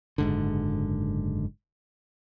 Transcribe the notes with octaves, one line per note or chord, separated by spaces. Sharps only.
F#1 G#2 D3